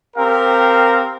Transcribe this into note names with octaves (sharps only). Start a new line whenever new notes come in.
C4 G4 A#4 F5